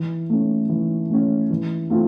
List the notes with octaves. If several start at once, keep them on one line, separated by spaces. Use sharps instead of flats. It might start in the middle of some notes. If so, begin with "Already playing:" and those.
Already playing: E3
A3 C#4
E3
A3 C#4
E3
A3 C4 F4